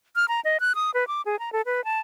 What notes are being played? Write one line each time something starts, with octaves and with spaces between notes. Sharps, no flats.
F6
A#5
D#5
F#6
D#6
B4
D6
G#4
A#5
A4
B4
A5